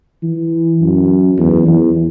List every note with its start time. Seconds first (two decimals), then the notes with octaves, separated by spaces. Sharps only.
0.23 E3
0.80 F#2
1.38 E2
1.67 E2